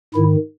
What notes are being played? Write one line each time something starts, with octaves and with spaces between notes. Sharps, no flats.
G#2 D#3 E4